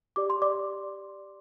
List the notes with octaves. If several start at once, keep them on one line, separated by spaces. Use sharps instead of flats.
G4 D5 D6
C6
D5 D6